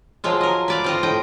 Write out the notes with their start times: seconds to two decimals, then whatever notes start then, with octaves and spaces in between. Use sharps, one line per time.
0.24 F3 F#3 G#3 F4
0.41 A#4 D#5
0.68 B4 D5 F5
0.84 C4 F4 D#5
1.03 A2 D#5 G5